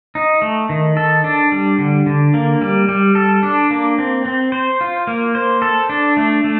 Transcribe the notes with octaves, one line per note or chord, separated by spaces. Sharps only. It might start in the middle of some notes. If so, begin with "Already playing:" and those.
D#4
A3
D#3
A4
D4
G3
D3
D3
A#3
G3
G3
A4
D4
A#3
C4
C4
C5
F4
A#3
C5
A4
D4
A3
A3